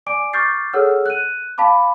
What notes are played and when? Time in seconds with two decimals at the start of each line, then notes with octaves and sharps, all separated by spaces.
0.06 D5 G#5 D6 D7
0.33 C#6 D6 F6 G6 A6 C7
0.73 G#4 A4 C#5 F#5 E6 F6
1.06 F#6 D#7
1.58 F5 A5 B5 D6